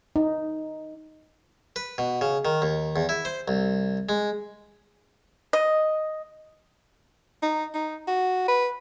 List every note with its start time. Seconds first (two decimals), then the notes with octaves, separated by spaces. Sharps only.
0.16 D#4
1.76 B4
1.98 B2
2.21 C#3
2.45 D#3
2.62 D#2
2.96 E2
3.09 E4
3.25 C5
3.48 C2
4.09 G#3
5.53 D#5
7.42 D#4
7.74 D#4
8.07 F#4
8.48 B4